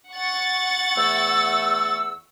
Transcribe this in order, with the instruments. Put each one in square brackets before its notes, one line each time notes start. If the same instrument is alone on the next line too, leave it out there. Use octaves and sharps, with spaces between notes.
[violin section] F#5 C#6 A6
[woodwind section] E2 A3 E6